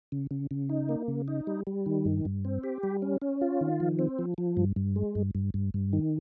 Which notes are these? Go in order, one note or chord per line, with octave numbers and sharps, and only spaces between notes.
C#3
C#3
C#3
D#4
A#3
C#3
D#4
G3
G3
D#3
G2
G2
C4
G4
G3
C#4
C#4
F4
D#3
F3
C4
F3
F3
G2
G2
G#3
G2
G2
G2
G2
D#3